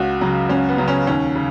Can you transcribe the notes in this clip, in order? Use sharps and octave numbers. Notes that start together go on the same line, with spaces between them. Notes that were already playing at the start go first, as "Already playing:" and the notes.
Already playing: C#2 F#4
C#3 F#3
C#2 C#4
B3
C#3 F#3
C#4
D#2 C#4
C#3